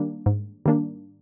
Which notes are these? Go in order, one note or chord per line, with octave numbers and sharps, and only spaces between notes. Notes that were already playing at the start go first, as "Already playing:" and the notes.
Already playing: D#3 G3 A#3 D4
G#2
D#3 G3 A#3 D4